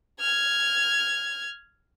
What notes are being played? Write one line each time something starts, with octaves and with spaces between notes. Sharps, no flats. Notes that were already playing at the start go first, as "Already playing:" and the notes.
F6 G#6